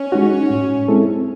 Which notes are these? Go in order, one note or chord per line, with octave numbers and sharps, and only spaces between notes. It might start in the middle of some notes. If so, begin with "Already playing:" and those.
Already playing: C#4
G#3 D#4 F#4
A2
G#3 C4 E4 A4